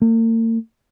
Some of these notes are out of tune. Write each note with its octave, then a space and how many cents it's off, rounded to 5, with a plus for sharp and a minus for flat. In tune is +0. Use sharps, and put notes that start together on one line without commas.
A#3 -45